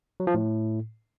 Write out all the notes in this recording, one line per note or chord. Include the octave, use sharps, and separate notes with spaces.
F#3
F3
A2